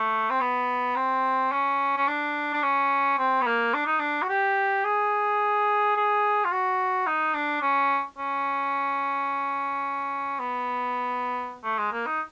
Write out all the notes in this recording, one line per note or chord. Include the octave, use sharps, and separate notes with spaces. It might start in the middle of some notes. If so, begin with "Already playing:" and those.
Already playing: A3
C4
B3
C4
C#4
C#4
D4
D4
C#4
C4
B3
A#3
D4
D#4
D4
F#4
G4
G#4
G#4
F4
F#4
D#4
D4
C#4
C#4
B3
A3
G#3
A#3
D#4